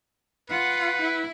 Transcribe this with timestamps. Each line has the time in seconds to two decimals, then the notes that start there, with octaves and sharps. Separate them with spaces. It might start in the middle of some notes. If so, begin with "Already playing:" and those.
0.50 F4 B4 F#5
1.02 E4